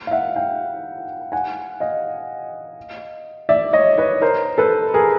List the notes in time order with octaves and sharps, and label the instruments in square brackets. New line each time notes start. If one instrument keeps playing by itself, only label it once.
[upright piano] F5
E5 F#5
F5 G5
F#5 G#5
D#5 F5
D5 E5
C#5 D#5
B4 C#5
A#4 C5
A4 B4
G#4 A#4